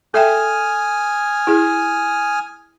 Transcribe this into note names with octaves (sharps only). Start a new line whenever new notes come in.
A4 E5 G5 G#5 D#6 F6
E4 G#4